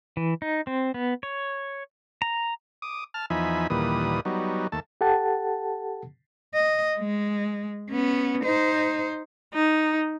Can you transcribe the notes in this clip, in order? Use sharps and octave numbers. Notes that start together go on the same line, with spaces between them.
E3
D#4
C4
B3
C#5
A#5
D6 D#6
A5 F6
E2 F3 D#4 E5 G#5 B5
D#2 A#2 E3 G3 B4 D#6
F#3 G3 B3 D#4
D#2 A3 A5
G4 A4 F#5 A5
D#5
G#3
B3 C#4
D#4 C5
D#4